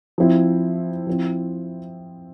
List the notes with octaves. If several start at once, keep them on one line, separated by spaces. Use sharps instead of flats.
F3 C4 E4
F3 C4 E4